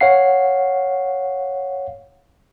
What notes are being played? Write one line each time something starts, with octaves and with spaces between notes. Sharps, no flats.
C#5 F5 F#5 C7